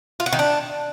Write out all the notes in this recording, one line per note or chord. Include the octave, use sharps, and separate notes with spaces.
F4
F#4
D#3
D4